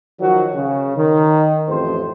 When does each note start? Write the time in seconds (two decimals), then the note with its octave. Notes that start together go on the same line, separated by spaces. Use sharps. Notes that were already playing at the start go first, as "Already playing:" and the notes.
0.19 D#3 F3 F#3 F#4
0.55 C#3
0.96 D#3
1.67 A1 F2 C5